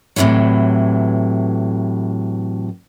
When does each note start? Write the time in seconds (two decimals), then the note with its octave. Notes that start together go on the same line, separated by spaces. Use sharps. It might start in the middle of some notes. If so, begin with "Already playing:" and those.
0.16 A2 C3 D#3 E3 F#3